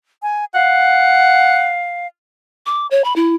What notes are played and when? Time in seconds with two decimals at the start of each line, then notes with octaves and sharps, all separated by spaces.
0.23 G#5
0.54 F5 F#5
2.66 D6
2.91 C#5
3.04 B5
3.16 E4